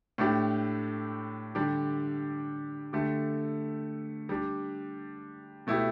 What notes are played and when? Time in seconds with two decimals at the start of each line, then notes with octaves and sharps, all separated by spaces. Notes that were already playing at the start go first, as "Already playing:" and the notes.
0.18 A2 A3 D4 G4
1.55 D3 G3 D4 G4
2.93 D3 A3 G4
4.29 G3 D4 G4
5.67 B2 A3 E4 G4